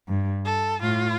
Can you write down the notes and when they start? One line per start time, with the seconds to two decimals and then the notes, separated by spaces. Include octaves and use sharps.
0.08 G2
0.45 A4
0.82 A2 F4